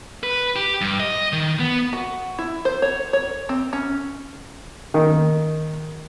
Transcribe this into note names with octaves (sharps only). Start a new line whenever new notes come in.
B4
G4
G2
D#5
D#3
B3
F#4
E4
C5
C#5
C#5
C4
C#4
D#3